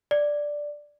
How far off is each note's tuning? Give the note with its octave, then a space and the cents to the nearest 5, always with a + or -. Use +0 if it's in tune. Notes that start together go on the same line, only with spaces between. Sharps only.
D5 +0